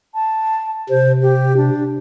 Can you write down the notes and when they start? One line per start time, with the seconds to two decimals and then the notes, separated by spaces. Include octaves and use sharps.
0.14 A5
0.90 C3 C5
1.22 G4
1.57 D4